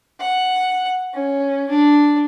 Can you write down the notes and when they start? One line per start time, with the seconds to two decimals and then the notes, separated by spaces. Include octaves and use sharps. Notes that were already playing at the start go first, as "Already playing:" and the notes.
0.20 F#5
1.14 C#4
1.69 D4